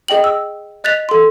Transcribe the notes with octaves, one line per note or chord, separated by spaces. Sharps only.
G#4 D#5 G5 F#7
E6
D#5 F#6 A6 B6 F7
A4 C6